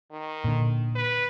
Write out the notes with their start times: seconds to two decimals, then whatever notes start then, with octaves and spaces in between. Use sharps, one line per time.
0.12 D#3
0.44 A#2 D3
0.95 B4